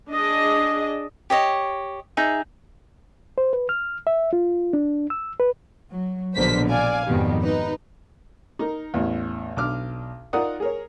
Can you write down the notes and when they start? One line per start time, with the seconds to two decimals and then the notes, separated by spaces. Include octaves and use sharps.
0.12 D4 G#4 D#5
1.30 G4 C#5 D#5
2.17 D#4 G#4 E5
3.38 C5
3.53 B4
3.69 F6
4.07 E5
4.33 F4
4.73 D4
5.10 E6
5.39 B4
5.91 F#3
6.36 A#1 B2 D3 A#4 C5 B6
6.68 D5 F5 G#5
7.06 F2 G#2 B2 D#3 G3
7.43 D#4 B4
8.59 D#4 A#4
8.94 A1 E2
9.57 B1 D4 D6 F6
10.33 D#4 F4 A#4 D5 F#5 D#6
10.60 G#4 A#4 C#5